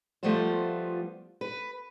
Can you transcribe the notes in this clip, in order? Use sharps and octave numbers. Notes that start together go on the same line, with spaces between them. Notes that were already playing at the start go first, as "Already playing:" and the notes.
F3 G3 A3 B3 F4 C5
B4